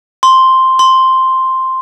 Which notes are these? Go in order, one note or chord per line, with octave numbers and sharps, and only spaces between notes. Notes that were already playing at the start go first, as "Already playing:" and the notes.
C6
C6